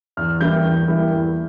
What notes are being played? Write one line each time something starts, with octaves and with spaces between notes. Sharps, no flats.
E2 F6
E3 G3 A#3 E4 G6
E2
E3 G3 A#3 E4
E2